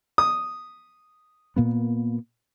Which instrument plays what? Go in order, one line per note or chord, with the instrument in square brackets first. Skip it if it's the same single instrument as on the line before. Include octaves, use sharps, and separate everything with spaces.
[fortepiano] D#6
[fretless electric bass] A#2 A#3 B3